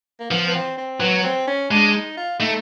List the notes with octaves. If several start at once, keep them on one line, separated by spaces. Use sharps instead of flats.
A#3
F3 B3
B3
C4
C4
F#3 B3
C4
C#4
G#3 D4
D#4
F4
A3 D#4